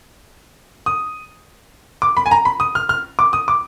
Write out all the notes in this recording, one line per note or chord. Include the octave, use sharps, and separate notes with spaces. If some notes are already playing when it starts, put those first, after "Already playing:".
D#6
D6
B5
G#5
A#5
B5
D#6
F6
F6
D6
D#6
D6